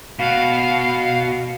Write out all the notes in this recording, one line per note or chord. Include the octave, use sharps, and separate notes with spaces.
B2 F#4 F5